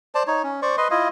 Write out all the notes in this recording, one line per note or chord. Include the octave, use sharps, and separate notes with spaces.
C5 D5 A5
D#4 C#5
C#4
C5 D5 C#6
B4 D#5 C6
E4 F4 D#5